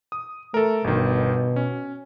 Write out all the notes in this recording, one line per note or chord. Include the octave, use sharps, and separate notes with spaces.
D#6
A3 A4 A#4
G1 B2 D#3
C#4